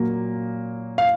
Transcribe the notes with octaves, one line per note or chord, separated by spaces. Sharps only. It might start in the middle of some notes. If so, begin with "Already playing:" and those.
Already playing: A#2 F#3 A#3
F5